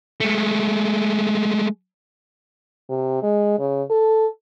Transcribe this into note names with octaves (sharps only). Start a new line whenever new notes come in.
G#3 A3
C3
G#3
C#3
A4